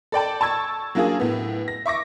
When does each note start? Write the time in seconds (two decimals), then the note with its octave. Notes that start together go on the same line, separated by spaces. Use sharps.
0.12 A4 D5 G5 A5
0.41 A5 C#6 E6 G#6
0.95 F#3 A#3 D4 F4 G#4
1.20 A2 B3
1.68 A#6
1.86 E5 C#6 D6 A#6